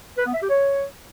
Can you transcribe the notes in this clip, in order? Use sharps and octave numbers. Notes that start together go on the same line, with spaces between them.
B4
B3
E5
G4
C#5